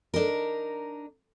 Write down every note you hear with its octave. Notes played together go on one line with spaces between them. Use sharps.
D4 D#4 A#4